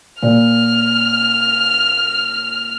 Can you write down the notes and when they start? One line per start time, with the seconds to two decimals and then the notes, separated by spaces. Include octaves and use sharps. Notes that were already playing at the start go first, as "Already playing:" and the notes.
0.23 A#2 F6